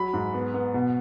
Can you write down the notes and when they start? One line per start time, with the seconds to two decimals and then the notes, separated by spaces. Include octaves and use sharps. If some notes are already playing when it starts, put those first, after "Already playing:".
Already playing: F#3 B5
0.13 G#2
0.34 B3
0.54 B3
0.74 B2